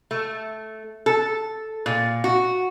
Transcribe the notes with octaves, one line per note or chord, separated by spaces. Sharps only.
A3
A4
A#2
F#4